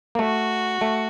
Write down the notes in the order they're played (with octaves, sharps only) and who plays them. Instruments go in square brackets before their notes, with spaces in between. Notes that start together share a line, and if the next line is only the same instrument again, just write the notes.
[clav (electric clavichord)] A#3
[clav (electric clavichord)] A3 [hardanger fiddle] F#4
[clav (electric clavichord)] A3